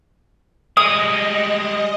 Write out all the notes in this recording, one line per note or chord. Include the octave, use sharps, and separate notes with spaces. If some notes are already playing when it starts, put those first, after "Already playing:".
G3 G#3 D#5 D#6